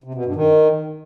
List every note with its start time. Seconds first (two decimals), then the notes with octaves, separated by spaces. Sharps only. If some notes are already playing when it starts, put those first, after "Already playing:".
0.04 C3
0.14 B2
0.25 G2
0.36 D#3